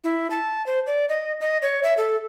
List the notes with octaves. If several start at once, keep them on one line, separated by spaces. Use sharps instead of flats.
E4
A5
C5
D5
D#5
D#5
C#5
E5
A4